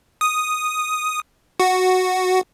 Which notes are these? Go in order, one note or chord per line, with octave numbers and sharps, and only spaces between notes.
D#6
F#4